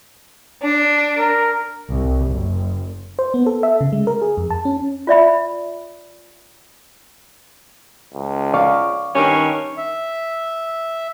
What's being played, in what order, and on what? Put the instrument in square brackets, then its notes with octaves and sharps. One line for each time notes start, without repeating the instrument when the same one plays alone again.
[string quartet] D4
[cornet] A#4
[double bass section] C2
F#1
[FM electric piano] C5
B3
A4
E5
C#3
G#3
A#4
G#4
F2
A5
C#4
[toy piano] F4 D5 E5 B5
[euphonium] C#2
[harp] D5 F5 C#6
[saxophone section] G2 A#3 C#4 [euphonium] D#3
[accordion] E5